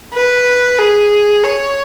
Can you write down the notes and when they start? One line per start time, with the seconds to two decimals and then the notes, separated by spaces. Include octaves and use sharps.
0.13 B4
0.78 G#4
1.44 C#5